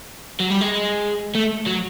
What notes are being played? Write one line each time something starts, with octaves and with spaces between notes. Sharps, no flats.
F#3
G3
G#3
A3
F#3